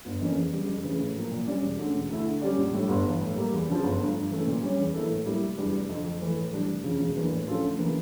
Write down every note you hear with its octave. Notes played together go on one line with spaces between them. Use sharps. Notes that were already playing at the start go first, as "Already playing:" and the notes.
G1
F2 E3 A#3 C#4
E2
C#3 G3
F2
C#3 E3 A3
A2
F3 A#3
A#2
G3 C#4 G4 D5
E1
D2 D3 A3 C#4
E1
D2 D3 A3 E4
D3
G3 C#4 G4 D5
A#1
A2 G3 D4
G1
G2 E3
A2
G3 A#3
E2
C#3 F3
G1
G2 F3 A3
G2
E3 A3 C#4
A#2
G3 C#4 G4 C#5
E2
E3 A#3 E4 A4
A2
G3 A#3 E4
F1
E2 E3 G3 D4
F1
F2 D3
F2
E3 A3
A2
E3 G3 D4
F1
E2 C#3 F3
E1
E2 E3 A#3 D4
A2
F3 C#4 F4 A4
D2
C#3 E3 A#3